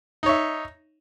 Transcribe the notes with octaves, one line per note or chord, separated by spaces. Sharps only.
D#4 C#5 E5